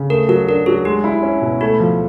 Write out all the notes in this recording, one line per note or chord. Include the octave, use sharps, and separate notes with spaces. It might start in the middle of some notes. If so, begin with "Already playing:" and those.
Already playing: C#3
A3 A#4
F#3 A#4
D4 A#4
F#3 G#4
G#3 G4
E4
C#4
B2
A3 F#4
F3